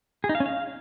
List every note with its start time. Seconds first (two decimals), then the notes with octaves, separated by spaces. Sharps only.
0.24 G#4
0.29 D#4
0.35 F5
0.40 C#4
0.46 F5